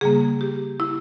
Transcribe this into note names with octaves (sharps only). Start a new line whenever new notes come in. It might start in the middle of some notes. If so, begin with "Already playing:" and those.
C#3 G3 A#3 G#4
G4
E4